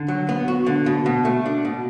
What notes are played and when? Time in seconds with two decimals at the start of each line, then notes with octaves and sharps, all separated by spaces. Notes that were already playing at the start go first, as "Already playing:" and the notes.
Already playing: D3
0.08 F#3
0.29 B3
0.48 F#4
0.66 D3
0.86 B2
1.06 B2
1.25 A3
1.46 D4
1.65 B2